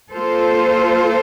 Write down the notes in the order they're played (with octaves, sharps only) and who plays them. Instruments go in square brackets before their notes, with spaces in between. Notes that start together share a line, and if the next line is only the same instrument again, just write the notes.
[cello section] A#3 F4 A4 C5